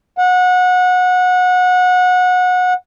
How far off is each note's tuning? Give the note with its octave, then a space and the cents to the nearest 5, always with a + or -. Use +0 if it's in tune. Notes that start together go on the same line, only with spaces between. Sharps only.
F#5 -25